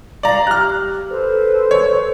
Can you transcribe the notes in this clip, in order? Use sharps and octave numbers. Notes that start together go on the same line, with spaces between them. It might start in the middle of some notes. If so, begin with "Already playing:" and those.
D5 F5 A#5
G4 F6 F#6
A4 B4 C5
C#5